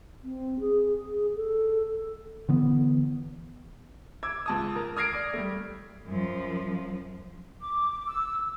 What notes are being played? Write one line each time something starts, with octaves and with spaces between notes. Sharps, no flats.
C4
G#4
G#4
A4
D3 E3 B3
D6 E6 G#6
C#2 A5 D#6
A#4
D#6 F6 G#6 A#6 C7 D7
D5
G3 A3
F#2 F3
D6
E6